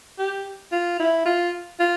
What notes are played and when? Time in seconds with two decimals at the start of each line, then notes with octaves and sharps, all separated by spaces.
0.19 G4
0.72 F4
1.00 E4
1.26 F4
1.80 F4